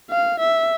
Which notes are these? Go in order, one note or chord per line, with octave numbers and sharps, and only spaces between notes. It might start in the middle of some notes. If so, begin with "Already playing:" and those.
F5
E5